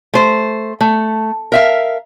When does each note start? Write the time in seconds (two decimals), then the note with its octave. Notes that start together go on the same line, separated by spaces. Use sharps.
0.14 A3 C5
0.81 A3
1.52 A#4 E5 F5